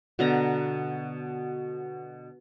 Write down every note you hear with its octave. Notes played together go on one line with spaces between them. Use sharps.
B2 D3 A#5